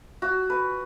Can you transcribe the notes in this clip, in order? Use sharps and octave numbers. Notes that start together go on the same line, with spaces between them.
F#4
B4